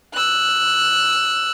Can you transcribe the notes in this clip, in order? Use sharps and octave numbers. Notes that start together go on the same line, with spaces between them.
E6 F#6